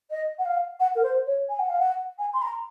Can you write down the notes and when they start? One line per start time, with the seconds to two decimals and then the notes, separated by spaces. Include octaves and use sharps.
0.10 D#5
0.38 F#5
0.45 F5
0.80 F#5
0.95 A#4
1.03 C5
1.26 C#5
1.49 G#5
1.59 F#5
1.69 F5
1.79 F#5
2.18 G#5
2.33 C6
2.42 A#5